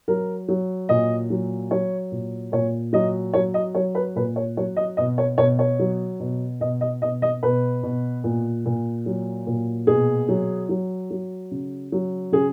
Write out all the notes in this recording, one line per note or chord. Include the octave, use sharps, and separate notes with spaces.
F#3 A#4
F#3
A#2 D#5
F#3
F#3 C#5
A#2
A#2 C#5
F#3 D#5
F#3 C#5
D#5
F#3 C#5
B4
A#2 B4
C#5
F#3 C#5
D#5
B2 D#5
C#5
B2 C#5
C#5
F#3
B2
B2 D#5
D#5
B2 D#5
D#5
B2 B4
B2
A#2
A#2
F#3
A#2
B2 G#4
F#3
F#3
F#3
C#3
F#3
C#3 G#4